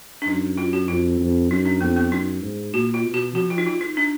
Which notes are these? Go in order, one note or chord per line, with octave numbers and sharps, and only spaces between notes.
D4
F#2 D#4
F4
F#4
F2 F4
F2
F#2 D#4
D4
F2 B3
B3
F#2 D#4
G#2
A#2 F#4
F4
B2
F#4
F3 F#4
F4
D#4
F4
D#4
D4